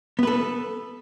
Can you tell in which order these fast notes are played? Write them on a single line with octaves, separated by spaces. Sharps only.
B3 B4 A4